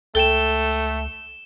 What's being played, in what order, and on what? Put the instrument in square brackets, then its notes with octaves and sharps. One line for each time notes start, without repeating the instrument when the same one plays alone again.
[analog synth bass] C#2 [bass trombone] A3 [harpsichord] A4 G5 [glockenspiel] E7 G7